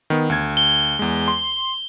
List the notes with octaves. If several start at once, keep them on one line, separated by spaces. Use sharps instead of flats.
D#3 B3
D2 G#6
G7
E2 G#3
C6